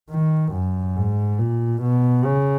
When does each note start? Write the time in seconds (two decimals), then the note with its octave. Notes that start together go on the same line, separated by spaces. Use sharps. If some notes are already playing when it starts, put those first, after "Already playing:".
0.11 D#3
0.53 F#2
0.97 G#2
1.39 A#2
1.82 B2
2.25 C#3